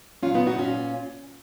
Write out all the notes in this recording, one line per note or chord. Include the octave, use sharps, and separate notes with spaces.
A#2 F#3 C#4 F4
B3 D#4
D#4 F#4
A#2 C#4 F4